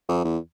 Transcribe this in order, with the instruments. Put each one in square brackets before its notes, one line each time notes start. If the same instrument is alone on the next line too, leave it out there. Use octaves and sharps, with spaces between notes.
[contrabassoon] F2
E2